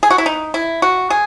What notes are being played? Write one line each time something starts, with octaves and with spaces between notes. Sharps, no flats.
G#4
F#4
E4
D#4
E4
F#4
G#4